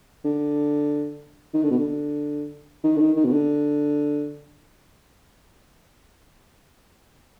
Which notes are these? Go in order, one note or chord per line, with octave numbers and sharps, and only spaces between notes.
D3
D#3
D3
B2
D3
D#3
D3
D#3
D#3
B2
D3